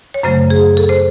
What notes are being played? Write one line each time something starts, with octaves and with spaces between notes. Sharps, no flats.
C#5
F#2 C#3 F#3 A3 C5
G#4
A4
C5